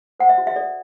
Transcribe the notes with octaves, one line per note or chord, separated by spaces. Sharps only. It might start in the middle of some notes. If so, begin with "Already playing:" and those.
C5 F#5
E5
F#4
E5
A4 D5